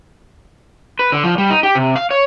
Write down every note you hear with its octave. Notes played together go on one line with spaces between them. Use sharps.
B4
D3
F3
G3
D#4
G4
C3
F5
C#5